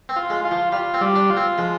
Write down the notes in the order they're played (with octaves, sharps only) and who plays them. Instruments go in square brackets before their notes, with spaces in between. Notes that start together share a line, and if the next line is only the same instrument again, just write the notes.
[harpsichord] C4
[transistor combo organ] F4
[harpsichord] G#3
[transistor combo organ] F4
[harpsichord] F3
[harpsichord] G3 [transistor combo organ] F4
[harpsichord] C4
[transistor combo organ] G3
[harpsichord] D4
[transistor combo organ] F4
[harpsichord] C4
[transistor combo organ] F3 [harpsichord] G#3